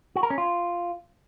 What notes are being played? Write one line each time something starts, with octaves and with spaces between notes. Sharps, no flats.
F#4
A#4
C#4
F4